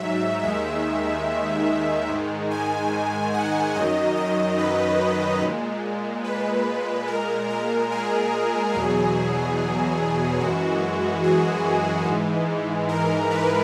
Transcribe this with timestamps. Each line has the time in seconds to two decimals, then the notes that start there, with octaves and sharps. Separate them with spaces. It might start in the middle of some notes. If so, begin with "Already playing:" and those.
Already playing: G#2 F#3 E5
0.43 D#2 D#3 G#3 E5
2.09 G#2 D#3 G#3
2.51 G#5
3.34 F#5
3.76 F#2 D#3 F#3 D#5
4.17 D#5
4.58 B4
5.41 A#2 G#3
6.24 B4
7.07 A#2 G#3 A#4
7.50 A#4
7.92 G#4
8.74 E2 B2 F#3 G#4
10.40 F#2 E3 G#3 F#4
11.24 G#4
12.06 G#2 E3 G#3
12.89 A#4
13.30 B4